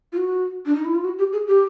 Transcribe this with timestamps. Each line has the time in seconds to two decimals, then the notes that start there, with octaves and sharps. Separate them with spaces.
0.12 F4
0.17 F#4
0.66 D4
0.75 D#4
0.85 E4
0.94 F4
1.04 F#4
1.19 G4
1.33 G#4
1.48 G4